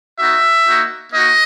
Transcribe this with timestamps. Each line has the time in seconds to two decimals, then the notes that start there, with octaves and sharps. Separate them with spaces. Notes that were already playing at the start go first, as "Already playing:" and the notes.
0.19 B3 D#4 F#4 E5
0.66 A#3 D#4 F#4
1.13 A#3 D#4 F#4 D#5